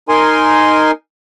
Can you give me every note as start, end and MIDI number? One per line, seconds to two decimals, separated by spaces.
0.09 0.91 63
0.09 0.91 70
0.09 0.91 80
0.09 0.91 84